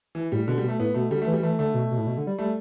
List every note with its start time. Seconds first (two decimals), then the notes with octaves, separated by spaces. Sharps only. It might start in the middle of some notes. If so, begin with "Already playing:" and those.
0.15 E3
0.32 A2 G3
0.47 B2 D3
0.58 G3
0.63 B2
0.68 A3
0.80 A2 B3
0.94 B2 A3
1.11 D3 G3
1.22 A3
1.27 E3
1.33 G3
1.43 E3 A3
1.59 D3 A3
1.74 B2
1.91 B2
1.98 A2
2.07 B2
2.17 D3
2.27 G3
2.38 G3 A3